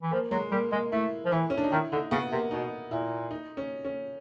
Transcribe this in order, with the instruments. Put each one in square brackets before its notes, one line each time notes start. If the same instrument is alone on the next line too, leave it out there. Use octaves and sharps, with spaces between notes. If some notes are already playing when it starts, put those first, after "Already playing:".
[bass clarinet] E3
[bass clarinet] F3 [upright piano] A#3
[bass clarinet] F#3 [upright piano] G#3
[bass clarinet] G3 [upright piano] A#3
[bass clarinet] G#3 [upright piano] A#3
[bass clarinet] A3 [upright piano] E4
[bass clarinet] F3
[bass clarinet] E3 [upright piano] E4
[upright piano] C#4
D4
D#4
[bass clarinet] D#3 [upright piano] E4
[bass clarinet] D3 [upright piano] D#4
[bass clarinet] C#3 [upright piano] B3
[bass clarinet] C3 [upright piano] A#3
[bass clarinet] B2 [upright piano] D#4
[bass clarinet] A#2 [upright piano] E4
[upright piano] D#4
C#4
C#4